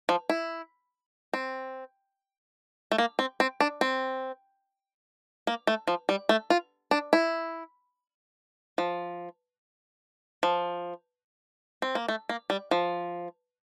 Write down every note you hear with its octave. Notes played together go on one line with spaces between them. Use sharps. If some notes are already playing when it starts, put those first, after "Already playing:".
F3
E4
C4
A3
A#3
C4
C4
D4
C4
A#3
A3
F3
G3
A3
F4
D4
E4
F3
F3
C4
A#3
A3
A#3
G3
F3